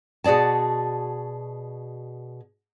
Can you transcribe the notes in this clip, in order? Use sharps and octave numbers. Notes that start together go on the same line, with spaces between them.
B2 F#4 G#4 D5 A5